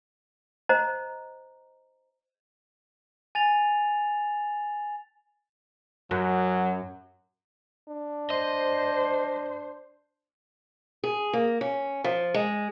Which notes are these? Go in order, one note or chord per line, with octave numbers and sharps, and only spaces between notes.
C5 D#5 A#5
G#5 A6 F7
F#2 F#3
D4
C5 D#5
G#4
A#3
C#4
F3
G#3